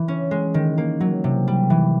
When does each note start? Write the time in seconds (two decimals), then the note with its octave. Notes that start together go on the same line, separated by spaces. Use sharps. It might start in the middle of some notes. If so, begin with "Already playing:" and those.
Already playing: E3
0.08 C#4
0.31 G#3
0.54 D#3
0.78 A#3
1.00 F#3
1.24 C3
1.48 G3
1.70 E3